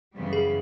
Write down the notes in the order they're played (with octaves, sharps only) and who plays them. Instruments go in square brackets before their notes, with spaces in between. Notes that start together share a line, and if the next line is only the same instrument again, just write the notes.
[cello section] F#2 C#3 E3 G3 B3
[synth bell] G#4